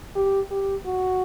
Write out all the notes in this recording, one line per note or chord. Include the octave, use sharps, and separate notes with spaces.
G4
G4
F#4